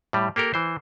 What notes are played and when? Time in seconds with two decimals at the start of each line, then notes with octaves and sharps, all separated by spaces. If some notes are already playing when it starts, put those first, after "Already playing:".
0.13 A2 G3
0.36 A#3 G4 A4 A#4
0.54 E3 C5